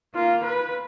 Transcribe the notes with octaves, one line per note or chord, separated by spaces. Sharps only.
A#3 F4
B4